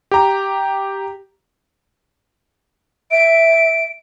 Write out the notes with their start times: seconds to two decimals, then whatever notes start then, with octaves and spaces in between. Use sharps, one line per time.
0.11 G4 A#5
3.11 E5 D7